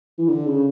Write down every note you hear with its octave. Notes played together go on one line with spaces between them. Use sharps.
E3
D3
C#3